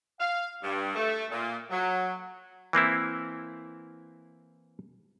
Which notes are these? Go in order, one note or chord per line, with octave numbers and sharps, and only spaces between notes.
F5
G2
A3
A#2
F#3
E3 A#3 C4 E4